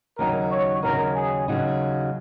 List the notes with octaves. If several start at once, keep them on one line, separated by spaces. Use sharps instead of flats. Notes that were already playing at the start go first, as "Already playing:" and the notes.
D#2 C#3 F#3 D#4 A#4
C#5
D#2 C#3 F#3 D#4 A#4
G#4
D#2 C#3 F#3 D#4